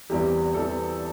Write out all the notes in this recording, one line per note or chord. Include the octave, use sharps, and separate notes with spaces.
E2 E3 G3 C4 G4
E3 G3 C4 A4